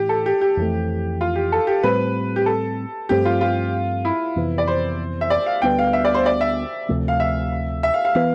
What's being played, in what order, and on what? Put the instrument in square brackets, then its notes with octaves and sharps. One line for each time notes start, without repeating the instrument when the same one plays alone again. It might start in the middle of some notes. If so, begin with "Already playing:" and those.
Already playing: [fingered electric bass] A2 E3 [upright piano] G4
[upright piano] A4
G4
G4
[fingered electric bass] F2 E3 A3
[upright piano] F4
G4
A4
G4
[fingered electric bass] A2 G3 C4 [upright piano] B4
[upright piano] G4
A4
[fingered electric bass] G2 F3 A3 C4 [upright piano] G4
[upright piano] F4
F4
E4
[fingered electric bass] F2 C3 E3 B3
[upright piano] D5
C5
E5
D5
F5
[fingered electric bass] D2 D3 G3 B3 [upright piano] G5
[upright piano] F5
E5
D5
C5
D5
E5
[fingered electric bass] D2 C3 F3 A3
[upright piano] F5
E5
E5
F5
F5
[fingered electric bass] E3 B3 [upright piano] F5